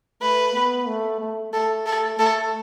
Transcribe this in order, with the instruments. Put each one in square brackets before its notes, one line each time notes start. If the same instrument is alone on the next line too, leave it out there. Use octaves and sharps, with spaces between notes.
[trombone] A3 [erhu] B4
[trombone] B3
A3
A3
[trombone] A3 [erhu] A4
[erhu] A4
[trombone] A3 [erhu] A4